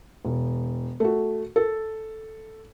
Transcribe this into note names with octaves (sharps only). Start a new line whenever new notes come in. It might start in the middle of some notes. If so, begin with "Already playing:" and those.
E1
A3 F#4
A4